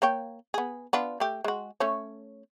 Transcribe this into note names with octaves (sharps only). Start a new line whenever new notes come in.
A#3 C#5 G5
B3 G#4
B3 D4 F4
A3 G4
G#3 F#4
A3 C#4 C#5